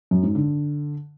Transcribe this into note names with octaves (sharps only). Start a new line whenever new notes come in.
F#2
G#2
D3